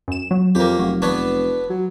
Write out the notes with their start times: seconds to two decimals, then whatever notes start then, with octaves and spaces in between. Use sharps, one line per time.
0.08 F#2 E7
0.31 F#3
0.55 F2 A#3 G4
0.79 F1 F#3
1.02 B3 D4 C#5
1.70 F#3